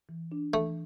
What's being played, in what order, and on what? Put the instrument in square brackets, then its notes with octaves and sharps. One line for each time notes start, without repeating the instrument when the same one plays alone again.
[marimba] E3
D4
[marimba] E3 [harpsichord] A3